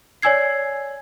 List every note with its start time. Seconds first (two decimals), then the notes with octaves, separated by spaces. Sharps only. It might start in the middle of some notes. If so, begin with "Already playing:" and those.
0.22 C#5 D5 G#5 E6 G#6 C7